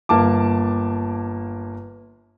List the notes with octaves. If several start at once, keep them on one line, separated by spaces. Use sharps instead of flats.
G1 A#3 A5 D6